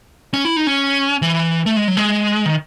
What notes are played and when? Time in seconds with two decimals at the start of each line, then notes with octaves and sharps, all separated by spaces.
0.34 C#4
0.45 E4
0.56 D#4
0.67 C#4
1.22 E3
1.66 A3
1.76 G#3
1.88 F#3
1.97 G#3
2.46 D#3